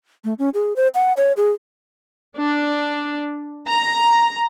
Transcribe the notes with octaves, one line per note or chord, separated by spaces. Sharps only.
A3
C#4
G#4
C5
F#5
C#5
G#4
D4
A#5